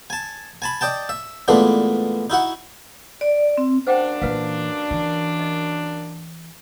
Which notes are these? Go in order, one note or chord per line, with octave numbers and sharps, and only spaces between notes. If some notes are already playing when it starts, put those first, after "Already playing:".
G#5 A5
G#5 A5 B5
D5 D#5 G5 A5
E5
A#2 E3 G#3 A3 B3 D4
D#4 E4 F#4 F#5
D5
C4
F#2 A#3 D4 C5 F#5 G5
A#2 E3 B4 F5
E3
D#5